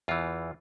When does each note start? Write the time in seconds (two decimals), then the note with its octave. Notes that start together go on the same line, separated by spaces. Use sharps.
0.08 E2 E3 F4